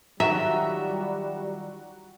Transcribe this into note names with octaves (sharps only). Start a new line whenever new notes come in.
D#3 F#3 G3 F4 F#4 E5 A#5